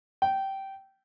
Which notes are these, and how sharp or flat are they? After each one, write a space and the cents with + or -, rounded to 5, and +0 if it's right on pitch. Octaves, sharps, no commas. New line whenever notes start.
G5 -15